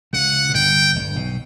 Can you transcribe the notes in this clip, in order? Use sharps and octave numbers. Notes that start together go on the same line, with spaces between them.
C#2 C#3 F#5
A#2
G1 G2 G5
G1 G2
B1 B2